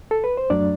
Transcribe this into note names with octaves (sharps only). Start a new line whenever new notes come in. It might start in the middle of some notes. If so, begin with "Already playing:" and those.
A4
B4
C5
F#2 F#3 A3 D4 D5